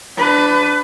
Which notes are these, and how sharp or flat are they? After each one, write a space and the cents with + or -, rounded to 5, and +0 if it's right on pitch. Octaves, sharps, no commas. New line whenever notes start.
D4 +0 B4 +30